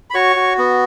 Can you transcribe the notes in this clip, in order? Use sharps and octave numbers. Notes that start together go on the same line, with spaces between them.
B5
F#4 C#5 C#6
F#4
B3